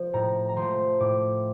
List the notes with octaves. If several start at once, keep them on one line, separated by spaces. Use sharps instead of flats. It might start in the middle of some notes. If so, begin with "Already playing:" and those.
Already playing: F3
A2 A#5
A#5
F3 A3 C6
A2 D6